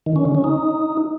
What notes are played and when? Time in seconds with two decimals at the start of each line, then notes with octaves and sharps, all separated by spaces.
0.06 D#3
0.16 C#4
0.25 D3
0.35 C#4
0.44 D#4